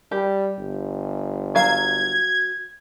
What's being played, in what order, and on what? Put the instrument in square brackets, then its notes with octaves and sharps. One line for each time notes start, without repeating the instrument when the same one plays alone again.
[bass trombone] G3 [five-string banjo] G4
[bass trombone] G1
[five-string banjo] F#3 F5 A#5 [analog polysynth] G#6